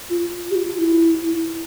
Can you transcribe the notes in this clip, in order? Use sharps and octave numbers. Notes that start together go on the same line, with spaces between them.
F4
G4
F4
E4